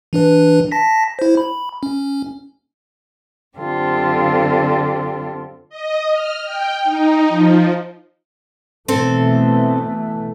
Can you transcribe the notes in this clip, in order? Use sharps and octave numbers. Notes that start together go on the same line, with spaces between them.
E3 D4 B4
A5 A#6 B6
E4 C5
B5
C#4
F#2 D3 C4 F4 G4 A4
D#5
F6
G5
D#4
F3
B2 E3 A3 C4 A4 C5